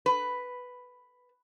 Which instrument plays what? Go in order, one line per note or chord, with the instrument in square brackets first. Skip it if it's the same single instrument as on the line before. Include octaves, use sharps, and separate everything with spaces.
[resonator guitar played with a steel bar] B4